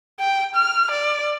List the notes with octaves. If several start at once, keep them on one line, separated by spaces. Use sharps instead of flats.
G5
F6
D5